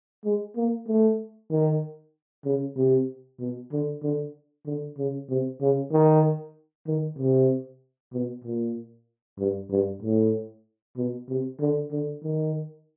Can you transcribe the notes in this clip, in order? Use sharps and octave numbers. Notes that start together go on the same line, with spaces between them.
G#3
A#3
A3
D#3
C#3
C3
B2
D3
D3
D3
C#3
C3
C#3
D#3
D#3
C3
B2
A#2
G2
G2
A2
B2
C3
D3
D3
D#3